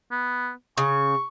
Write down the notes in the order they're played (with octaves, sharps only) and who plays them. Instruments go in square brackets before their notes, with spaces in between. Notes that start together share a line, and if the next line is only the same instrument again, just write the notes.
[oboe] B3
[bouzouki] C#3 [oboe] C#6